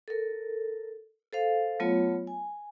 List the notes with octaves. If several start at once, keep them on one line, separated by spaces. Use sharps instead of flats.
A4 A#4
A4 C5 F5
F#3 A3 B3 F4 C#5
G#5